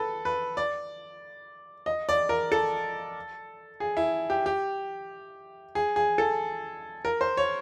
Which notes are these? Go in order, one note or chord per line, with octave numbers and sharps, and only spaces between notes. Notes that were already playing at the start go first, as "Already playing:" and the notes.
Already playing: A4 B4
B4
D5
D#5
D5
A#4
A4
G#4
E4
G4
G4
G#4
G#4
A4
A#4
C5
C#5